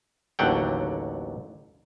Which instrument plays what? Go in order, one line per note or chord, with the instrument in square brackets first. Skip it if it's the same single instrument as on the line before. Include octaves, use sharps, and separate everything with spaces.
[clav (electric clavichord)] A1 D#2 D3 F#3 F#5 G5